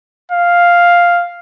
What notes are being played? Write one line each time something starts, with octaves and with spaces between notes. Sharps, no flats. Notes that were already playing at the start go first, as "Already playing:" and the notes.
F5